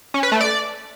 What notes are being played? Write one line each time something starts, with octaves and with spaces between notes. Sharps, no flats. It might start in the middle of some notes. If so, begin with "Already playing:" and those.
C#4
B4
A3
D5